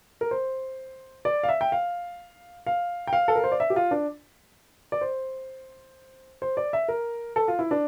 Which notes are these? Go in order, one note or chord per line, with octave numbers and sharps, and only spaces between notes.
A#4
C5
D5
F5
E5
G5
F5
F5
G5
F5
A4
A#4
C5
D5
E5
G4
F4
D4
D5
C5
C5
D5
E5
A#4
A4
F4
E4
D4